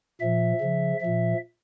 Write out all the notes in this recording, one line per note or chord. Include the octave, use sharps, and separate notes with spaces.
A#2 F3 E5
C#3 F3
A#2 F3 E5